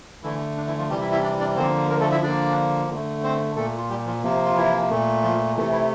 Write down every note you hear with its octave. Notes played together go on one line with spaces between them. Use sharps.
D3 E3 A3 E4
D4
E3 E4
F3 F4
C3 E3 G3 G4
E4 E5
E4 E5
D4 D5
D4 D5
D3 F3 A#3 C4 C5
A#3 A#4
A3 A4
E4 E5
D3 F3 A#3 D4 D5
D3 A3
C4 C5
A#2 A3 A4
F4
G3 G4
F3 F4
C3 F3 A#3
F4
E3 E4
A#2 A3
F3 F4
C3 E3 A3
E3 E4